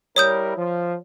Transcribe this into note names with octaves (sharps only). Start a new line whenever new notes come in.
G3 E4 A#4 C#5 D#6 G6
F3